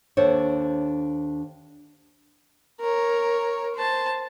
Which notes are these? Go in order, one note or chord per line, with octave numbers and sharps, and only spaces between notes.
D#2 D4 A4 C5 C#5
A#4 C#5
C5 A5